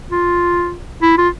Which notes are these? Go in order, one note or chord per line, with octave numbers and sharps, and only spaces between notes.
F4
E4
F4